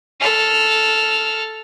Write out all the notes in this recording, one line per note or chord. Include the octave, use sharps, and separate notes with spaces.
A4 F6